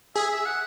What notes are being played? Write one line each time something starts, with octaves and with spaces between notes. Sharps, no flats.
G#4 E5
E5
F#5